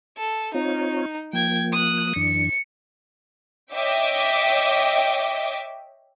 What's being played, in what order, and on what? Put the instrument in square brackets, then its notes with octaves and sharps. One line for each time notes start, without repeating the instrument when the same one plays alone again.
[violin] A4
[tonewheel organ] C4 F4 C#5 [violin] D#4
[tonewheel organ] F3 A#3 [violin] G5 G#6
[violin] D#6 F#6
[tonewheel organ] F#2 E3 D4 [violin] C#7
[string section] C#5 D#5 E5 G5 D6